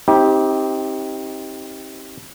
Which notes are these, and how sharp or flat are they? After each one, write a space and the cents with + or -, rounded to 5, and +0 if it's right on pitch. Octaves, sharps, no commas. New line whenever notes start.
C4 +30 D#4 +40 G4 +0